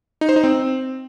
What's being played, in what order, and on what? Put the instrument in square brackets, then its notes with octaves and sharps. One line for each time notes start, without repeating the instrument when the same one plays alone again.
[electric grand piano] D#4
C5
D#4
C4